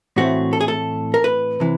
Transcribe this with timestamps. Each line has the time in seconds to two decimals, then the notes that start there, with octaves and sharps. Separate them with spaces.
0.16 A2 E3 A3 C4 F#4
0.53 A4
0.60 G#4
0.68 A4
1.14 A#4
1.24 B4
1.60 C3 E3